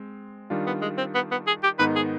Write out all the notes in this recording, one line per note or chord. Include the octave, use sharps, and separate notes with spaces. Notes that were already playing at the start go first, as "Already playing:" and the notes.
Already playing: G#3 C4
D#3 G3 D4 F4
B3
G#3
C4
B3
B3
G#4
G4
G#2 D#3 B3 D#4 B4
G#4